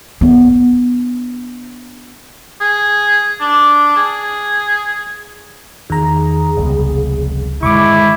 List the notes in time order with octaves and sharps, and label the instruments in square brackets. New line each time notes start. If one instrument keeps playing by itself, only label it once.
[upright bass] B3 D4
[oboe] G#4
D4
G#4
[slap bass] E2 [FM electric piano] D#3 A#5 [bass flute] G#4
[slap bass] F1 G3 B3 [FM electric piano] C#2
[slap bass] G2 D3 D#3 [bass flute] G#3 [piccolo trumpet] E4 [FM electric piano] C#6 D6